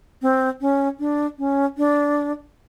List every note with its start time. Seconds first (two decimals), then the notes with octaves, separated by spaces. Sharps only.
0.22 C4
0.61 C#4
0.99 D4
1.38 C#4
1.78 D4